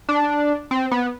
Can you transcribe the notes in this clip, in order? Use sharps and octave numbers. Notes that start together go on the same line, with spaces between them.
D4
C4
B3